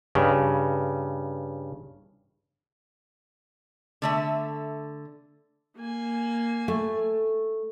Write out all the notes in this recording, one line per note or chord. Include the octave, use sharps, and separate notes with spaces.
G2 C#3
D3 A3 E5
A#3 G#5
A3